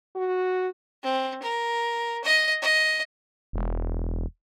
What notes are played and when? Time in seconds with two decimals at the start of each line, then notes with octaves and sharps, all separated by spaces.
0.16 F#4
1.03 C4
1.42 A#4
2.24 D#5
2.62 D#5
3.53 E1